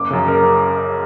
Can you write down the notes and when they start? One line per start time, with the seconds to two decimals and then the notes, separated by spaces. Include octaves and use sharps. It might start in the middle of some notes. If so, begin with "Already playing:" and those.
Already playing: F#1 D6
0.10 F#2 C#3
0.28 F#1 A#4